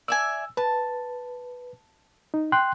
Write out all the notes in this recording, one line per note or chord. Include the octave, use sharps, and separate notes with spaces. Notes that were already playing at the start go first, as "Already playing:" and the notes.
D5 E5 G#5 E6
B4 A5
D#4
G5 C6 F#6